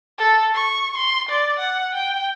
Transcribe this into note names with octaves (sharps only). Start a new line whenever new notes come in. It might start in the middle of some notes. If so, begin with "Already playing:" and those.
A4
C#6
C6
D5
F#5
G5